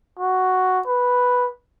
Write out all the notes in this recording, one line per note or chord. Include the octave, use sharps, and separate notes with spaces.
F#4
B4